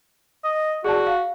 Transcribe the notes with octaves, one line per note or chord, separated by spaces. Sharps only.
D#5
F#4 G#4 D5 A5
F5